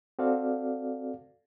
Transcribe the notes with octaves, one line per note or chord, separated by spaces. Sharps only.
C4 F#4 A4 D5 F5